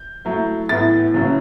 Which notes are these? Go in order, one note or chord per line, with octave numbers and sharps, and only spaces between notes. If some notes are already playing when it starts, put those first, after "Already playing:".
Already playing: G6
F#3 A3 E4
A2 E3 B3 A6
C#3 F#3 C#4 E4